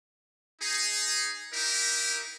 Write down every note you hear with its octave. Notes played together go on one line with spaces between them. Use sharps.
D#4 G#4
D#4 E4 G4 A#4